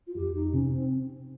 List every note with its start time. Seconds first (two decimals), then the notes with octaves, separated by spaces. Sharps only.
0.07 F4
0.15 F2 G4
0.34 D#4
0.53 C3 C#4
0.67 C#4
0.72 C4